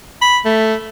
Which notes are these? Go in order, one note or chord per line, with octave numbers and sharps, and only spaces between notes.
B5
A3